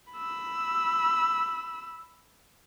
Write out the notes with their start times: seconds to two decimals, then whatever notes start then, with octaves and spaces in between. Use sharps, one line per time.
0.13 B5 E6